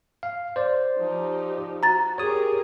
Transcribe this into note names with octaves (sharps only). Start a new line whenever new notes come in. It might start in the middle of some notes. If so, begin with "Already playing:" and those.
F5
C5 D5
F3 D#4 G4
F#4 A#5 A6
G4 G#4 A#4 C#5 D#6